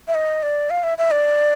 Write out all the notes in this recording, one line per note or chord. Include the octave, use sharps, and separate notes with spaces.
E5
D#5
D5
F5
E5
E5
D5